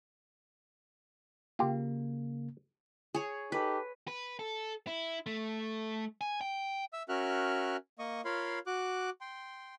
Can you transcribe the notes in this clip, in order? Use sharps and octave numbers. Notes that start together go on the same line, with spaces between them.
C#3 A#3 F4 G4
G#4 C#5
D#4 G4 A4 B4
B4
A4
E4
A3
G#5
G5
E5 E6
C#4 F#4 A#4 E5 F6 F#6
A#3 D#5 C#6 D#6
F4 A#4 C#5 F5 B5 C6
F#4 D6 F#6
G5 C6